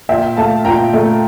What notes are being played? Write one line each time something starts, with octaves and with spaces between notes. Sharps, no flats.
A#2 E5 G5
A3 F5 A5
A#2 G5 A#5
A3